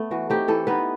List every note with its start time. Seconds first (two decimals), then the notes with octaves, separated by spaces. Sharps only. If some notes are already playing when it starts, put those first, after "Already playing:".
Already playing: A3 B3
0.11 E3 F#4
0.30 A3 C4 D#4 G4
0.48 E3 A4
0.67 B3 D#4 B4